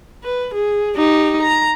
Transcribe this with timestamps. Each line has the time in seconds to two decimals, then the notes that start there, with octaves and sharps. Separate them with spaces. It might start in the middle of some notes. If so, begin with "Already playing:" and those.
0.23 B4
0.54 G#4
0.97 D#4 G4
1.42 A#5